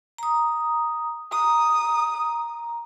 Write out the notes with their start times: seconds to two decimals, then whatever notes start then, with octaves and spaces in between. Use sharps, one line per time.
0.18 A#5 D#6
1.32 A#5 D#6